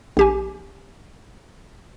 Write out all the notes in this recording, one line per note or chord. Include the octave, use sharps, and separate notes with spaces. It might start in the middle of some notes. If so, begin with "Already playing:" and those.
A#1 G4 G#5